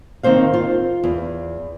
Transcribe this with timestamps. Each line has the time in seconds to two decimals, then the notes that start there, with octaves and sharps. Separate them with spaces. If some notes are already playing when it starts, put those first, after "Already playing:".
0.23 D#3 A#3 C4 C5 F5
0.54 F4
1.04 E2